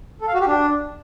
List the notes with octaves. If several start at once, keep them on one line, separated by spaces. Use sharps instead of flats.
A4
F5
F#4
G4
D4